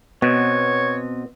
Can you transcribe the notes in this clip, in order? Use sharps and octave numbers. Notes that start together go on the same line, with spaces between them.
B2 B3 C4 C#5